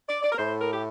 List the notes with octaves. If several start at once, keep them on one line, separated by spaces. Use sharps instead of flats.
D5
D5
A#4
A2 C5
A#4
G4